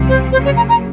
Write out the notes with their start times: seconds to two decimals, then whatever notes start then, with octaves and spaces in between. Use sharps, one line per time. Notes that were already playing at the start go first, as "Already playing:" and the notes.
Already playing: C2 C3 F3 C4
0.09 C5
0.32 C#3 F#3 A#3 C5
0.45 C#5
0.56 A#5
0.69 A#5